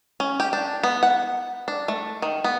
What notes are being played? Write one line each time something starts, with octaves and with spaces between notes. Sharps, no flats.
C#4
G4
D4
B3
F#5
D4
A3
D#3
B3